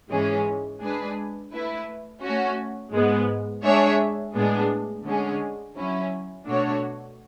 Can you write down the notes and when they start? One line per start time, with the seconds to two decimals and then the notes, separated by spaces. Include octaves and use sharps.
0.11 G#2 E3 G#3 C#4 G#4
0.82 G#3 D4 G#4 B4
1.52 A3 E4 B4
2.22 A3 C#4 F#4
2.94 G#2 G#3 B3
3.64 G#3 D4 G#4 C#5 E5
4.35 A2 G#3 B3 D4 G#4
5.05 D3 G#3 C#4 G#4
5.76 F#3 C#4 E4
6.47 B2 A3 D4 F#4 C#5